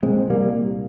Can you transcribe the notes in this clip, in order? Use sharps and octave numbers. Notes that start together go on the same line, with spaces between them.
C2 A#2 G#3 C4
G3 A#3